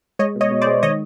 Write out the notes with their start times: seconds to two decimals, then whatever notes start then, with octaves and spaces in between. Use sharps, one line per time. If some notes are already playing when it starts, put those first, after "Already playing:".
0.19 G#3 C#5 D#5
0.35 B2
0.41 C#5 D#5
0.51 B2
0.62 C5 D5
0.66 G#3
0.83 D#3 C#5 D#5